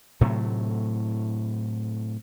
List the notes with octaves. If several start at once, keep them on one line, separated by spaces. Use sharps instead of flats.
A2 C3 F#3 A3